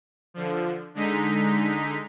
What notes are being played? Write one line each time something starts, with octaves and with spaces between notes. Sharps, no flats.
D3 F3
D3 G#3 D#4 B6